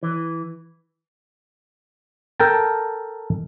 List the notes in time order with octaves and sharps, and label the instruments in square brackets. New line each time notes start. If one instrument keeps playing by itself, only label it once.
[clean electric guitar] E3
[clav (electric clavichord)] A4 A#4 G5 A5